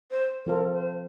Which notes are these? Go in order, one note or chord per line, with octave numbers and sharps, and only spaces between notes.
C5
F3 C4 F4 A4 A#4 C5
C5